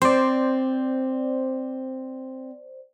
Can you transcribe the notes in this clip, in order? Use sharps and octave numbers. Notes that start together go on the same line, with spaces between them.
C4 C5 D5